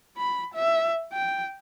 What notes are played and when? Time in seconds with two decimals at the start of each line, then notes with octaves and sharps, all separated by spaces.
0.17 B5
0.54 E5
1.13 G5